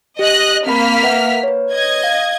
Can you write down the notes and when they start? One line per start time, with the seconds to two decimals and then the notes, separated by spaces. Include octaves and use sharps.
0.19 G4 D#5 F#6
0.67 A#3 C4 B5 F6 B6
1.03 B4 E5 F#5
1.43 B4 C#5
1.72 D#5 G#6
2.04 F5